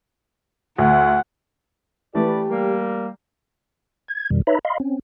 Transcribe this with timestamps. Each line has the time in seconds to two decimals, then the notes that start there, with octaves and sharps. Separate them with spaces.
0.78 D2 F#5
2.15 E3 A3 G4 B4 D5
2.50 G3 A#3
4.08 G#6
4.30 F2 B2 D#3 G3
4.47 D#4 B4 C#5 E5 A#5 B5
4.65 D#5 F5 B5 C6
4.80 C4 C#4